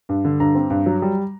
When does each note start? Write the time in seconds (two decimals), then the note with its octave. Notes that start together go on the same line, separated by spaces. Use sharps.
0.09 G2
0.25 D3
0.40 G2 A#5
0.55 C4
0.70 G2
0.86 F#3
1.02 G3